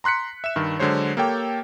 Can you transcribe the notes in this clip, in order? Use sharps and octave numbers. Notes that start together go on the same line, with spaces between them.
A#5 C6 F#6 B6 C#7
E5 E7
G2 D#3
D3 F#3 G#3 C5 C#5
A#3 G4 A4 C#5 G5